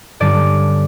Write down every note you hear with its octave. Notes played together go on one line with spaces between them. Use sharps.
G2 D3 G3 C#4 D5